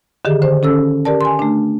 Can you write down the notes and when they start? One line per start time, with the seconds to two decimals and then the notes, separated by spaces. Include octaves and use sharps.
0.25 D3 D#3 G4 G#4
0.42 D3 C5
0.63 C#4 A4 E6
1.05 G4 A#4 D5 A5
1.21 G#5 C6
1.39 A3 D4